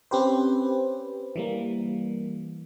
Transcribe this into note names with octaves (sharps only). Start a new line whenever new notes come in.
C4 C#4 G4 B4 C5
E3 G3 A#3